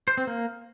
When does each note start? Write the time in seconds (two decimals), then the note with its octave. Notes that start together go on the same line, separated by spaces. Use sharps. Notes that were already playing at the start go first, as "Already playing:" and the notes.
0.08 C5
0.17 C4
0.27 A#3